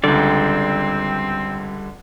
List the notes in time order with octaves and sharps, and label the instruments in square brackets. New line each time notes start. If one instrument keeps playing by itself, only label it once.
[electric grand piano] C#2 D3 [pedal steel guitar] G3 D5 [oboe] C4